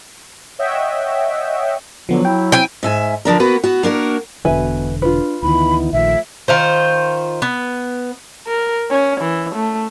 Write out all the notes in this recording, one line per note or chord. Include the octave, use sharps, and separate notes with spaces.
C#5 D#5 E5 F#5 G5
D3 F3 F#3 B3
E4 G5
C4 G5 G#5
G#2 E5 G#5
D3 F3 D4 A#4
A#3 B3 F#4 B4
B3 F#4
A#3 D4 F#4 A#4
E1 B2 D3 B4 E5 G#5
D4 F4 B4
D2 D#3 E3 B3 D#4 E4 B5
A#1 D#3 F3 A3 E5
D#3 F4 C5
B3
A#4
C#4
E3
A3